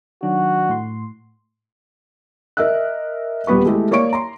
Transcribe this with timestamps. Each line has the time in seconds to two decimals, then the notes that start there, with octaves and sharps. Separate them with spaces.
0.23 D#3 F#3 D4 F#4
0.69 A2 C6
2.57 A#4 D#5 E5 E6 F#6
3.47 D#1 G3 B3 B4 C#6
3.66 G#3 A3 E4 G4 A4
3.91 A#3 C#5 D5 C#6 D7
4.13 A#5 C6